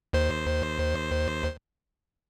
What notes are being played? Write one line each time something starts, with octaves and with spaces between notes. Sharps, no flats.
D#2 C5